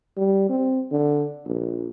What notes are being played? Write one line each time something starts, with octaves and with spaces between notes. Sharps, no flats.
G3
C4
D3
A#1